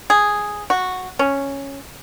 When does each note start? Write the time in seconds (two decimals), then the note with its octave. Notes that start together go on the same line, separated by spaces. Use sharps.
0.10 G#4
0.70 F#4
1.19 C#4